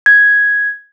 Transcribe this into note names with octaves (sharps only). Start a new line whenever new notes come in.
G#6